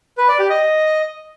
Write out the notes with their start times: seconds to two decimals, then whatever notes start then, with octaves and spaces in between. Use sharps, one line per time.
0.18 B4
0.28 D5
0.39 G4
0.50 D#5